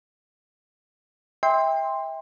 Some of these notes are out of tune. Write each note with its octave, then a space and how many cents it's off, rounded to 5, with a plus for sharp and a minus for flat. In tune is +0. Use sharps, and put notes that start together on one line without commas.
E5 -30 G5 +25 C6 +0